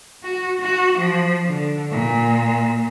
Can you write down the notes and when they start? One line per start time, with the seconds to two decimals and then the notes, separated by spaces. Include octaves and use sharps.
0.23 F#4
0.60 F#4
0.98 F3
1.46 D3
1.91 A#2